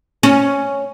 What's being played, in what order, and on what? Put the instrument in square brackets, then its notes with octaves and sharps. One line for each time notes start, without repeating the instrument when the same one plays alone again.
[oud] C#4